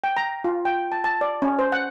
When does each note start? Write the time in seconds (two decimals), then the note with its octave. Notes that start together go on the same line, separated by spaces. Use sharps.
0.04 G5
0.17 A#5
0.44 F4
0.65 G5
0.92 A5
1.04 A5
1.21 D5
1.42 C#4
1.59 C5
1.72 F#5